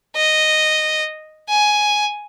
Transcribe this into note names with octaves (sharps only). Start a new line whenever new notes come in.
D#5
G#5